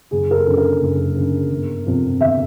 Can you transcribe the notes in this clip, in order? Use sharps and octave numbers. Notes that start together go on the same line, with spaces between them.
F#1 G#4
A#4
A4
F#2 D3 A4
A#4
F#1
F#2 D3
G1
F2 C3 F3
G1 E5